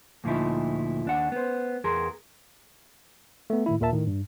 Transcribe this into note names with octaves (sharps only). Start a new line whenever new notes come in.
D2 A#2 F3 D#4 E4
D#2 D4 F#5
B3 C5
E2 G#4 A#4 C6
A3 B3
A2 D#3 E4
D#2 A#2 F4 A#4 E5 A5
A2 D#3
G2